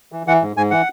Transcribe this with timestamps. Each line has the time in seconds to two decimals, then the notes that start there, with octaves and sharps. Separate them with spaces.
0.12 E3
0.27 E3 F#5
0.42 G#2
0.56 G#2 G#5
0.71 E3 F#5